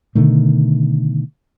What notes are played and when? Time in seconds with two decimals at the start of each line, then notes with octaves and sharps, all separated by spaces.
0.15 B2 D3 D#3 A3